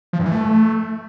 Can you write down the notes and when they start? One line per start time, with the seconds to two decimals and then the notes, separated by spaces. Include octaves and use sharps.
0.13 F3
0.19 G2
0.25 E3
0.32 A3